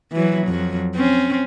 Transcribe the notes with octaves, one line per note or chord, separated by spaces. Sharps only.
E3 F#3
F2 F#3
C4 C#4